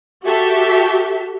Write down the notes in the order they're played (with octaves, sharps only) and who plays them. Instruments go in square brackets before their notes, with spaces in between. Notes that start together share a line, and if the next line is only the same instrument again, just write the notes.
[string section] F#4 G4 A4 E5